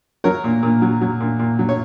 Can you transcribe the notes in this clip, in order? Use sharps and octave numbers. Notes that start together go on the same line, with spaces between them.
F#3 A#4 C#5
A#2
A#2
F#3
F#3
A#2
A#2
F#3
C#5